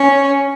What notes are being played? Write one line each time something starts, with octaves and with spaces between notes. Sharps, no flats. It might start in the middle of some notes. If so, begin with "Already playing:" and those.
Already playing: C#4